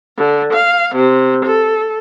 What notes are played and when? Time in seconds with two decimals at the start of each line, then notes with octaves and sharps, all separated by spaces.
0.16 D3
0.53 F5
0.95 C3
1.45 A4